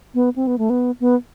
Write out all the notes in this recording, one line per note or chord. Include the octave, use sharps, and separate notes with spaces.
B3
C4
B3
A3
B3
B3